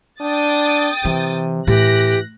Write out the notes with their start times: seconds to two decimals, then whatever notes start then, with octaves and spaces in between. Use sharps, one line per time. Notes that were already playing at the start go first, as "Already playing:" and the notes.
0.20 D4 G5 D#6 A6
1.05 C3 E3
1.67 A2 E3 G4 F#6 A#6